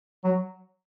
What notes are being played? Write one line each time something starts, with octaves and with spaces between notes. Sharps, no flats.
F#3